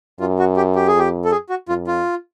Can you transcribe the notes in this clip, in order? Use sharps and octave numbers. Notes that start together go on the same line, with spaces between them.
F#2 F4
F#4
G4
G4
G#4
F2 G4
A4
G#4
F#4
F2 F4
F4